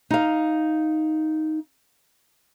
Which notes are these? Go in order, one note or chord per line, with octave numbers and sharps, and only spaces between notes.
D#4 F5